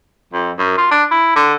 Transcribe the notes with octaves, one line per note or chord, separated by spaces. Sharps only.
F2
F#2
F4
D4
E4
D3